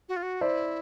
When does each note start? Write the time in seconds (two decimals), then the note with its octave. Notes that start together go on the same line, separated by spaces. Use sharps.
0.09 F#4
0.16 F4
0.23 F#4
0.41 E4 C5 D5